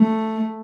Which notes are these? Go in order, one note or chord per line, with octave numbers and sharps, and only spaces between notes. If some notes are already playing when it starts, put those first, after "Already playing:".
Already playing: A3